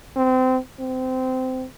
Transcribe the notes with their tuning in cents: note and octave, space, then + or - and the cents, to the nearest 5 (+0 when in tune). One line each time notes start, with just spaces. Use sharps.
C4 -25
C4 -20